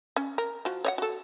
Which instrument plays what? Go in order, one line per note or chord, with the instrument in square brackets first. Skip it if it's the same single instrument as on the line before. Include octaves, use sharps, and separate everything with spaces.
[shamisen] C#4
A#4
F3 F#4
C#5 D#5 F#5
F#4 A4